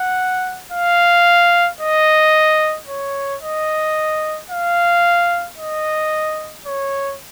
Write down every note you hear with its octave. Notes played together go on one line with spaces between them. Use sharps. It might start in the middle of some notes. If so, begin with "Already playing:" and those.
Already playing: F#5
F5
D#5
C#5
D#5
F5
D#5
C#5